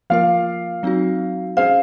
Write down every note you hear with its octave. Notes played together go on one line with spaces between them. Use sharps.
F3 A#3 F4 A#4 F5
F#3 C4 D#4 F#4
C#4 G#4 C5 F5